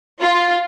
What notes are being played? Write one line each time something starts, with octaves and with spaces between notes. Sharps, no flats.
F4